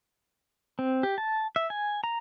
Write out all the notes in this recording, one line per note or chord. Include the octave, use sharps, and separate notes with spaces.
C4
G4
A5
E5
G#5
A#5